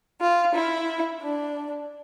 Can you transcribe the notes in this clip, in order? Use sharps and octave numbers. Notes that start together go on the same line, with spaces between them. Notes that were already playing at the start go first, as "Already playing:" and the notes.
F4
E4
D4